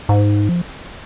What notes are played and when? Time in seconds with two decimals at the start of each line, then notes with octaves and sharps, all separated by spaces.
0.09 G#2
0.49 F3